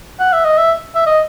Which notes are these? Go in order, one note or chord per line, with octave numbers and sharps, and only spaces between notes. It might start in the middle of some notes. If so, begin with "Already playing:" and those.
F#5
E5
D#5
E5
E5
D#5